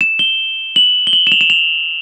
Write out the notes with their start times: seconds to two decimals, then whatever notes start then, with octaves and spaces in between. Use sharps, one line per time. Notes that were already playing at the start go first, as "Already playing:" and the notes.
0.01 E7
0.19 G7
0.76 F#7
1.07 G7
1.13 F#7
1.27 E7
1.32 F7
1.41 E7
1.50 F7